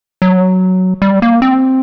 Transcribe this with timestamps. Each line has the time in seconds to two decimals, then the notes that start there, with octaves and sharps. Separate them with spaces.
0.22 F#3
1.02 G3
1.22 A#3
1.42 C4